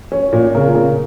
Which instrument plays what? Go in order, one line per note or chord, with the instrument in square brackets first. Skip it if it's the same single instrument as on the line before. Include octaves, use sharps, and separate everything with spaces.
[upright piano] C#4
A#2
C#3 A#4
C#3